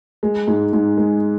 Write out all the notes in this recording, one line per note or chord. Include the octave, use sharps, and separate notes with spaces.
G#3
G#2
G#2
G#3